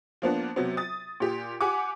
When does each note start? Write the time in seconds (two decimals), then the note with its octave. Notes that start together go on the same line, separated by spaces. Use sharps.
0.22 F3 A#3 B3 D4
0.56 C3 F#3 B3
0.77 D#6 A6
1.20 A#2 G4
1.61 G4 F#5 G#5 D6